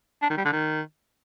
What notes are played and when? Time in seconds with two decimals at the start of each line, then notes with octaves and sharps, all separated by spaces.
0.22 D4
0.30 D#3
0.37 G3
0.45 D3
0.53 D#3